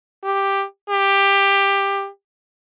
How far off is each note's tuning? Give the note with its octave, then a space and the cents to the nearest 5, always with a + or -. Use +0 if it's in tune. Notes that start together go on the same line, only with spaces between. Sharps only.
G4 +5
G4 +15